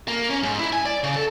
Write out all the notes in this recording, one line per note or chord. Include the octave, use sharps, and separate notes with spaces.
A#3
C#4
G#2
E4
G#5
D5
C#3
A4